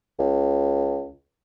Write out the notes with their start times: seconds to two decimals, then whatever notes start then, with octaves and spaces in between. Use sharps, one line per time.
0.19 C#2